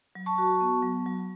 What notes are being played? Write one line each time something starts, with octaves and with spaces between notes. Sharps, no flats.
F#3
A5 C#6
F#4
B3
F#3
F#3